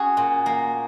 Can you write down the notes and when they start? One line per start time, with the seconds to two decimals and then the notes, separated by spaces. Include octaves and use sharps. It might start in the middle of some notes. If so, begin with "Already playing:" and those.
Already playing: C#4 F#4 G#4
0.17 A#2
0.46 A#3